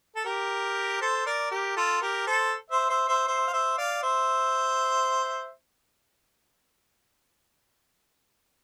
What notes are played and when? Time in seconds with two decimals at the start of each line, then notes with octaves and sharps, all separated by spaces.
0.16 A4
0.25 G4 A#4
1.01 A4 C5
1.26 A#4 D5
1.51 G4 A#4
1.76 F4 A4
2.01 G4 A#4
2.27 A4 C5
2.70 C5 E5
2.90 C5 E5
3.08 C5 E5
3.27 C5 E5
3.48 F5
3.53 C5 E5
3.78 D5 F5
4.03 C5 E5